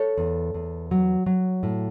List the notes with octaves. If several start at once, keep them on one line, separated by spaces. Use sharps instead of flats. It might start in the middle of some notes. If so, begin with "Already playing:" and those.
Already playing: A4 C#5
E2
E2
F#3
F#3
A2